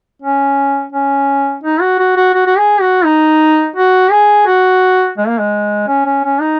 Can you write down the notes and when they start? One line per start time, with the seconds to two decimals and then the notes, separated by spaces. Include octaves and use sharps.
0.22 C#4
0.92 C#4
1.64 D#4
1.81 F#4
1.99 F#4
2.17 F#4
2.34 F#4
2.47 F#4
2.58 G#4
2.81 F#4
3.05 D#4
3.76 F#4
4.11 G#4
4.47 F#4
5.18 G#3
5.28 A#3
5.39 G#3
5.88 C#4
6.06 C#4
6.24 C#4
6.41 D#4